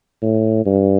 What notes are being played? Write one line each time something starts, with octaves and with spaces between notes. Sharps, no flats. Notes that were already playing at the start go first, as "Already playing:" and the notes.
A2
G2